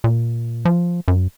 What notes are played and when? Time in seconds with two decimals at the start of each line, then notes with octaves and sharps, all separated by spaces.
0.04 A#2
0.65 F3
1.08 F#2